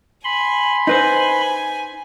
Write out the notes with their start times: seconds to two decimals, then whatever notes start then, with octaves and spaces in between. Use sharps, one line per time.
0.24 G#5 B5 C6
0.87 D#4 B4 C5 G#5